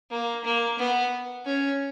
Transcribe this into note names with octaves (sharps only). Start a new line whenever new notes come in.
A#3
A#3
B3
C#4